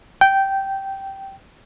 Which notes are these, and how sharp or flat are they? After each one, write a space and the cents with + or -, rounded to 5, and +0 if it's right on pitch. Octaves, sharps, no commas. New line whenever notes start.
G5 -10